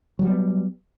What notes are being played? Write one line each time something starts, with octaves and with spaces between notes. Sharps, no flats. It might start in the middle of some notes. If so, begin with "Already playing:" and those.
F#3 G3 B3